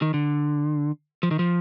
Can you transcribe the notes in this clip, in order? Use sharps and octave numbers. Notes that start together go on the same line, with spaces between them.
D#3
D3
F3
D#3
F3